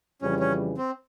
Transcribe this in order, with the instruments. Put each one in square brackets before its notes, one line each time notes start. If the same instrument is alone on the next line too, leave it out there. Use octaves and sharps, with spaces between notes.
[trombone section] F2 C#3 E3 G3 [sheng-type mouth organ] C#4
[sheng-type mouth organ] C#4
C4